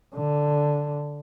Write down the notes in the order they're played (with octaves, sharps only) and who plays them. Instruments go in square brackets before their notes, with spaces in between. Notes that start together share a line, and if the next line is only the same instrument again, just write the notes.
[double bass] D3